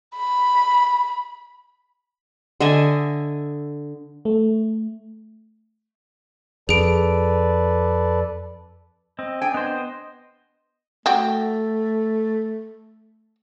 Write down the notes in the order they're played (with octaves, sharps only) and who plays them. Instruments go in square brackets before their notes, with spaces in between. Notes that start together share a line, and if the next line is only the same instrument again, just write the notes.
[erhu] B5
[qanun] D3 D#5 E5 G#5
[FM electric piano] A3
[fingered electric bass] F2 [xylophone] G#4 D7 [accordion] A4 B4 D5
[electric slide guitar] C4 [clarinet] D#5
[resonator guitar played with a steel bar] D4 G5 [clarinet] G#5
[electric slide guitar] B3 C5 [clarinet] D#5
[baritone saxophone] A3 [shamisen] F#4 G4